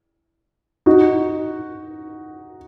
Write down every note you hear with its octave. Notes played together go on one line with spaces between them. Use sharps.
D#4 F#4